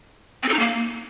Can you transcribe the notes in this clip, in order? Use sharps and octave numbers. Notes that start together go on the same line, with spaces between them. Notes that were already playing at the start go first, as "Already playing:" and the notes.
C4
A4
D#4
A#3